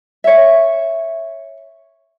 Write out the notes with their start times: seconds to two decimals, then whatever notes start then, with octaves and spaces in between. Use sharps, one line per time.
0.24 C#5 E5